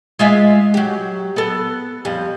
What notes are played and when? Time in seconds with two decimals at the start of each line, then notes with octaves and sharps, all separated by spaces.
0.19 G#3 F4 E5
0.74 F#3 G4
1.36 B3 A4
2.05 F2 G3